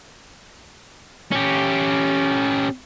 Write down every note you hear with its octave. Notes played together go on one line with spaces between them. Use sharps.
C#4 G4